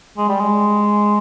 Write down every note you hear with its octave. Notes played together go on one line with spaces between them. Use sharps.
G#3
G3
G#3